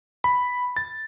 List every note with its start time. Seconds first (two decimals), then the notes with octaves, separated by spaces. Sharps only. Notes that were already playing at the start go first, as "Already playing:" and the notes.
0.24 B5
0.77 A6